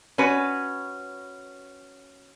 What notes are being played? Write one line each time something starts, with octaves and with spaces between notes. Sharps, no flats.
C#4 F#4 B4